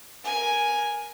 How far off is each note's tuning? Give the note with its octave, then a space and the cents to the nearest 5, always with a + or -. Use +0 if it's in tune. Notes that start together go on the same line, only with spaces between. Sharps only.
A#4 +20 G#5 +0